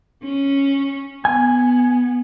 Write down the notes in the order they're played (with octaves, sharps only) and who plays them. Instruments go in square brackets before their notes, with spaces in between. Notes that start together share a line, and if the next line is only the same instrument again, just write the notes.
[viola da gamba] C#4
[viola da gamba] B3 [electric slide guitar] G#5